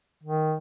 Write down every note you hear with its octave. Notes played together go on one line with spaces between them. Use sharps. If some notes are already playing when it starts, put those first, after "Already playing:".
D#3